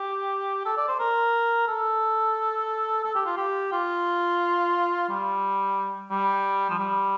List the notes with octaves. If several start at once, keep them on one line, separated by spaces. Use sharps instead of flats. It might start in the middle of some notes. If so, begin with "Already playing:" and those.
Already playing: G4
A4
D5
C5
A#4
A4
A4
G4
F4
G4
F4
G3
G3
F3
G3